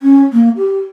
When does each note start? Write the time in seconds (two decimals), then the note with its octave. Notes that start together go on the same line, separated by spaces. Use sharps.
0.02 C#4
0.33 A#3
0.56 G4